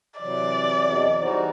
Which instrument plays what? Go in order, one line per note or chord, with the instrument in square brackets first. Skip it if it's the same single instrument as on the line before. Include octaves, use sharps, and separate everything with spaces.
[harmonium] C3 E3 F#3 [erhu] D5
[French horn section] E2 F#4 D#5
[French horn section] E3 G#4 C5 [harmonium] G3 D#4 F#4